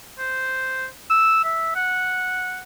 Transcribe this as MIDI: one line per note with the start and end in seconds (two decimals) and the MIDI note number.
0.19 0.87 72
1.10 1.43 88
1.44 1.74 76
1.75 2.62 78